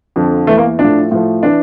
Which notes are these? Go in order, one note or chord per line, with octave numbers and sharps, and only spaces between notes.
F2 D3 F3
E2 E3 A3
A#3
F3 D4
A2
A2 F3
E3 D4